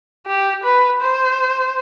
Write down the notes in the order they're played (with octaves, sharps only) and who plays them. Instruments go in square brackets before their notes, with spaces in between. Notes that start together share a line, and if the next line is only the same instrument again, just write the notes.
[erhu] G4
B4
C5